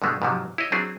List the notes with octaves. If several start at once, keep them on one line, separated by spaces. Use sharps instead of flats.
G2 B2 D3 G#3 A3
G#2 C3 F3 F#3
E4 C#5 D#5
F#3 C4 D4 E4 G#4